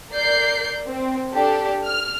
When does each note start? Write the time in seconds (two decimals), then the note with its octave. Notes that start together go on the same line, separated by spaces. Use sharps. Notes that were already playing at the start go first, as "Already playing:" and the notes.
0.12 A#4 D5 G6 C7
0.87 C4
1.33 D4 G4 A4
1.86 F6